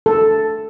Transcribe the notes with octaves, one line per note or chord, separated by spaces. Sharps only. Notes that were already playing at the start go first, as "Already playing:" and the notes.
A4